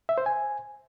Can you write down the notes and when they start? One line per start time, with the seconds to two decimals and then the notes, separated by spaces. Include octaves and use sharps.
0.09 E5
0.18 C5
0.26 G#5